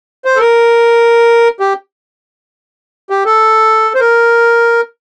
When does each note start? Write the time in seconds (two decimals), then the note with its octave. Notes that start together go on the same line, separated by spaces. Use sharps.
0.25 C5
0.36 A4
0.41 A#4
1.60 G4
3.10 G4
3.25 A4
3.95 C5
4.00 A#4